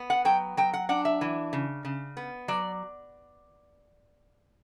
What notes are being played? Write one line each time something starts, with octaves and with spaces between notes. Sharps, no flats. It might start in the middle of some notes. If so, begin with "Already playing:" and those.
Already playing: B3
F#5
F#3 G5
F#3 G5
F#5
D4 F#5
E5
E3
C#3
C#3
B3
F#3 D5